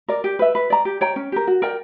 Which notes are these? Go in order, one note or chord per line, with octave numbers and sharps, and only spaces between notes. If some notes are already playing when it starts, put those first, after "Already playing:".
A#4 D5
G4
B4 E5
B4
D5 A#5
G4
C#5 G5 A#5
C#4
G4 A#4
F#4
A#4 D5 G5